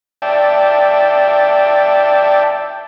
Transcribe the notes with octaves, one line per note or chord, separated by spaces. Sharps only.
D5 E5 G5 A5